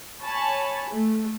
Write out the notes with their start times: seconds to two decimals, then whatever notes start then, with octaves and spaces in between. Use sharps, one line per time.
0.22 C#5 G#5 A5 B5
0.92 A3